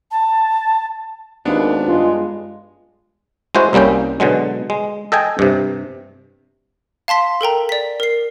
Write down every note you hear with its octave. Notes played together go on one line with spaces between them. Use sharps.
A5
G#1 D#2 B3 D4
G2 G#3 F4
G#3 E4 F#4 C5
C2 G3 A#3 C#4 G5
B2 D3 F#3 G#3
G#3
A4 D#5 G5 G#5
G2 C3
F5 A5 C6 B6
A4 A#4 G5 A#5
D5 B6
A#4 C7